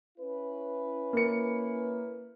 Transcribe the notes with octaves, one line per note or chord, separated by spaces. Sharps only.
C#4 E4 B4
A#3 C#7